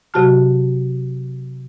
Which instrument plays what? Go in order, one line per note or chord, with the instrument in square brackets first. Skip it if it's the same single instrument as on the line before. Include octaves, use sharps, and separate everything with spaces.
[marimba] C3 F#3 F#4 G4 A5 F6